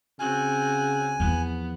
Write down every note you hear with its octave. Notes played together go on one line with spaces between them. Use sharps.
C#3 C4 F#4 G#5
E2 F3 B3